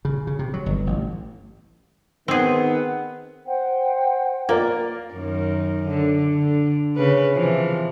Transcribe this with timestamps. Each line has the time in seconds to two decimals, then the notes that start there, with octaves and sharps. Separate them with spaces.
0.05 C#3
0.27 C#3
0.39 C3
0.54 F#3
0.66 G1
0.87 A1
2.28 D#3 B3 C4 G#4
3.44 C5 F#5 G5
4.49 A#3 F4 A#4 D5
5.14 F#2 D#3
5.88 D3
6.34 D3
6.96 C#3 B4
7.33 C3 E3 F3